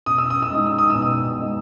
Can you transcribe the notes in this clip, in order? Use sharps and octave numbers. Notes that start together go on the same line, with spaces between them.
B2 D#6
E6
D#6
E6
G#3 D#4 D#6
E6
D#6
B2 E6
D#6
G#3 D#4